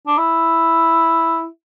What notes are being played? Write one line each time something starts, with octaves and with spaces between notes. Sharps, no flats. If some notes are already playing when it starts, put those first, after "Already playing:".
D4
E4